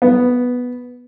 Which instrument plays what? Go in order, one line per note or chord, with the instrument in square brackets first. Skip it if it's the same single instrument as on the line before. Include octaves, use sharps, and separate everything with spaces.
[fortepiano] B3